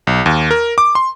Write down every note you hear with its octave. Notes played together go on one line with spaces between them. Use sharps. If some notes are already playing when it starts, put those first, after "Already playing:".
B1
D#2
A#4
D6
C6